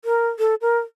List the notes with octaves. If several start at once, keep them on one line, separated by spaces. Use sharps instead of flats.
A#4
A4
A#4